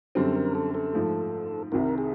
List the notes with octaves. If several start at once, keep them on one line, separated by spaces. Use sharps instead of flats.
F#2 D3 G3 C4 A4
A#4
A4
A4
G#2 F3 A3
C2 C3 D#3 A#4
G#4